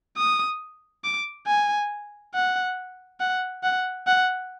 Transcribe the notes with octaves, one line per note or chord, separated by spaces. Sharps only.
D#6
D6
G#5
F#5
F#5
F#5
F#5